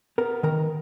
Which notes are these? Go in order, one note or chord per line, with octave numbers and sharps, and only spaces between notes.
B3 A#4 A#5
D#3 A#4 A#5